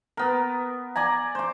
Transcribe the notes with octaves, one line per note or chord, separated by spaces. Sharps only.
B3 A#4
D5 G#5 A#5
C5 D6